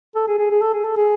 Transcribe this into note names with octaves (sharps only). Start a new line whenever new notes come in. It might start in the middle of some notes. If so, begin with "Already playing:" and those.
A4
G#4
G#4
G#4
A4
G#4
A4
G#4